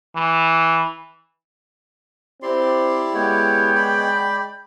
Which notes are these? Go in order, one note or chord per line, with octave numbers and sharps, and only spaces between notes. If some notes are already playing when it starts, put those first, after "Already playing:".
E3
C4 E4 G4 D5 C6
G#3 B3 C#5 G5
D5 B5